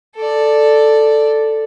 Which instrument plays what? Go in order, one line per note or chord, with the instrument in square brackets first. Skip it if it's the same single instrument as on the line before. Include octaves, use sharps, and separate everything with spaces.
[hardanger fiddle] A4 D5